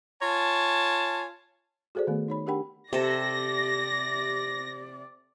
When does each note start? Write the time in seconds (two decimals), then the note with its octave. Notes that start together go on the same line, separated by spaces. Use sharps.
0.22 F4 C#5 G#5 A5
1.95 F#4 G#4 A4 C5 D5
2.07 D#3 A3 B3
2.28 D#4 C#5 B5
2.46 D4 G4 A#4 F#5 G5 B5
2.93 C3 G4 A4 D5 A#6